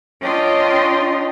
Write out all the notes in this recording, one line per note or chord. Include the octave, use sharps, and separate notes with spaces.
C#4 D4 F4 D#5 G5 C6